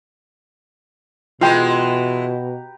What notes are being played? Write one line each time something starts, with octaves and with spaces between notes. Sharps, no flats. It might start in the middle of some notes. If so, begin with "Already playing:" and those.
B2 E3 G#3 F4 G4 B4 G5 A#5